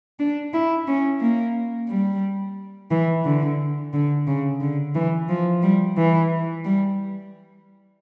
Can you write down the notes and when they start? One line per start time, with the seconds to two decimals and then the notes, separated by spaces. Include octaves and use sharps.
0.19 D4
0.54 E4
0.88 C#4
1.21 A#3
1.89 G3
2.91 E3
3.25 D3
3.93 D3
4.27 C#3
4.61 D3
4.95 E3
5.29 F3
5.63 G3
5.97 E3
6.65 G3